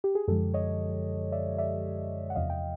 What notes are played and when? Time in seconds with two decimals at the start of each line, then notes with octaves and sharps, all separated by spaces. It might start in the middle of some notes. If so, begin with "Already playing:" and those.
0.04 G4
0.15 G#4
0.28 F#2 D3 F3 G#3 G4 A4
0.54 C#5 D#5
1.32 D5 E5
1.58 D5 E5
2.30 F#5
2.35 E2 C3 F3 D#5 F5
2.50 G5